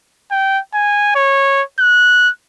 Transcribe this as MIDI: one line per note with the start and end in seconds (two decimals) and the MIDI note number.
0.31 0.60 79
0.74 1.12 80
1.16 1.62 73
1.80 2.30 90